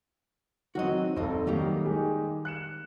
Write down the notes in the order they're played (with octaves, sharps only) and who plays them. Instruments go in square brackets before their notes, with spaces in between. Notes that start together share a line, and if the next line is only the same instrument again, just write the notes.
[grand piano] D#3 F#3 C4 [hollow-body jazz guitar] F#4 D#5
[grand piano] F1 G2 A4 [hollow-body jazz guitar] C4 D#4
[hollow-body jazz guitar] D#3 G3 A#3 [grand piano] F#3 D#4 G4
[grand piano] G#3 D#4 G4
F#6 C#7 E7